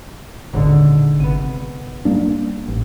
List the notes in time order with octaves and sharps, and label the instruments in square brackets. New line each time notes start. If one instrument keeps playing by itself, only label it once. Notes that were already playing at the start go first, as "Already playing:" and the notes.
[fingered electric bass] D#1 G#1 [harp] G#2 D3
[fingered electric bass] G#1 C3 [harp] B3 D#7
[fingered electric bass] G3 A#3 D4
A1